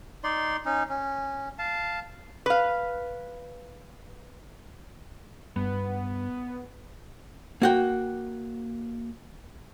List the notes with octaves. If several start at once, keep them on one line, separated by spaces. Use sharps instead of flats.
D#4 D5 C6
C#4 D#4
C#4
F5 A5
B4 F5
G2 B3
A#3 F#4 G5